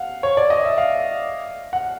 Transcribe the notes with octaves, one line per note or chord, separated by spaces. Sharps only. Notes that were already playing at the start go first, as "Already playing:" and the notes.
Already playing: F5 F#5
C#5
D5
D#5
E5
F5
F#5